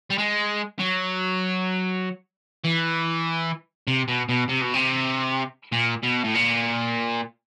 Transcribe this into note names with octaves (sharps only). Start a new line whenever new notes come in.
G3
G#3
F#3
E3
C3
B2
B2
C3
B2
C3
A#2
B2
A2
A#2